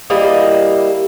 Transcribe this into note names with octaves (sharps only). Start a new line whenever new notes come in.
G3 A#3 E4 D#5